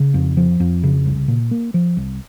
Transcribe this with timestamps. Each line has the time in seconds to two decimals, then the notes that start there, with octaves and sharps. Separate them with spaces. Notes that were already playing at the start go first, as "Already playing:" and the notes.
Already playing: C#3
0.14 F2
0.37 F3
0.60 F2
0.83 C#3
1.06 C2
1.28 A#2
1.51 A#3
1.74 F3
1.97 C2